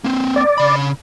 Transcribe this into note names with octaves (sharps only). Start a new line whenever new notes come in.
A#3 C4
D5
C#3 B5